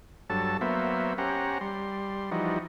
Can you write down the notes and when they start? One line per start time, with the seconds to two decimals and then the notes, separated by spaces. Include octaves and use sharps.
0.30 G2 F#3 A4 A5
0.61 F#3 A#3 B3 C5 E5
1.18 C#4 G4 C5 F#5 A#5
1.61 G3 C6
2.31 E3 F3 G3 D#4 F#4